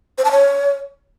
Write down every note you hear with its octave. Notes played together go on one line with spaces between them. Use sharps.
C5
A5
C#5